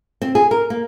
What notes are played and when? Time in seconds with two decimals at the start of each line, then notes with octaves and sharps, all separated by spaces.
0.22 C4
0.35 G#4
0.51 A#4
0.70 A#3